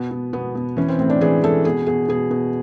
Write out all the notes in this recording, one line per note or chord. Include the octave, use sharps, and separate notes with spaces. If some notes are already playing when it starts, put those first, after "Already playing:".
Already playing: B2 B3
B2
B2 B3
B2
E3 C#4
C4
A2 C4
D4
E3 G#4
E3 A4
B2 G#4
B2 G#4
B2 G#4
B2